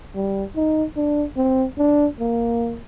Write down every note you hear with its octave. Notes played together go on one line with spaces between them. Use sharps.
G3
D#4
D4
C4
D4
A#3